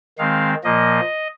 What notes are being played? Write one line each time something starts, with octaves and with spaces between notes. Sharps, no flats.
D#3 G#3 C4 F5
A#2 F3 A#3 D#5